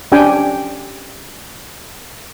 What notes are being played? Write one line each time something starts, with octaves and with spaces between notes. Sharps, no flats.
C#4 D4 G4 G5 G#5